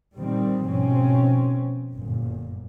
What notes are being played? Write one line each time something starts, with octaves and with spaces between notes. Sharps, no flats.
A#2 D#3 G3 C4
G#2 B2 F3 C4 C#4
G1 F#2 A#2